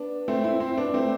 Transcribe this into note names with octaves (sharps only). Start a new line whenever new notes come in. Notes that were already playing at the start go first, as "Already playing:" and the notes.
Already playing: B3 D4
A3 C4
C4 E4
C4 E4
B3 D4
A3 C4